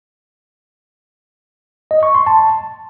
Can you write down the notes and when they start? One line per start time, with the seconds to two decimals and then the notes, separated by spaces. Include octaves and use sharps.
1.91 D#5
2.03 C#6
2.15 C6
2.27 A5